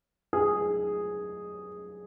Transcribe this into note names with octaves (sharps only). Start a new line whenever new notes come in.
G#4